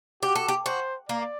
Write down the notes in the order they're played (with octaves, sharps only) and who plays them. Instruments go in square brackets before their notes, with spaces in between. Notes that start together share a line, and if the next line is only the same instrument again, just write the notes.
[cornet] F#4 [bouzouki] G4
[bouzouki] A4
G4
[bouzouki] F#4 [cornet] C5
[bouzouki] A#3 [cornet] D5